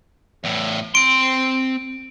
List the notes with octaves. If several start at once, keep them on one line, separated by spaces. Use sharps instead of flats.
E2 A2
C4 C6 D7